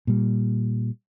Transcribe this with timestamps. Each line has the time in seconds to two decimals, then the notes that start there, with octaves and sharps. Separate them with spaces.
0.07 A#2 G3